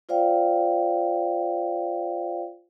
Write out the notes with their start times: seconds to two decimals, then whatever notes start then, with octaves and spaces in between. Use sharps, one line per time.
0.09 F4 C5 D5 F5 G5